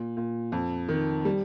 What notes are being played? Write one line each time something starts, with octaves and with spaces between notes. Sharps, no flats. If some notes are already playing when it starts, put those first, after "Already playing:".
Already playing: A#2
A#2
F2
D#3
G3